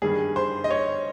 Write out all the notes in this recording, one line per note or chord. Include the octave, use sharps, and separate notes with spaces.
G2 D#3 G3 G#4
C5
D#5
C#5